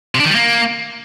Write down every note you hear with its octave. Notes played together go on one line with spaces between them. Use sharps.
C3
D4
D#3
G3
A#3